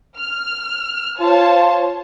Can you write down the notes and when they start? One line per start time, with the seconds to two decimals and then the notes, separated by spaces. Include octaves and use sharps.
0.17 F6
1.20 F4 C5 C#5 A5